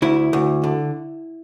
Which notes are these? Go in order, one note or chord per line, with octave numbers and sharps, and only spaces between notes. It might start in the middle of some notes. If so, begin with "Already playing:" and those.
D2 E4
D2
D3